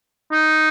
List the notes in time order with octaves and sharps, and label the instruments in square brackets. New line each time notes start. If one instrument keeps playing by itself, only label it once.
[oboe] D#4